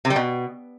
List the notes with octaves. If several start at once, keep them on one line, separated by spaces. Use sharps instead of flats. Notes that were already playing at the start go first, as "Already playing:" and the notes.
C3
G3
B2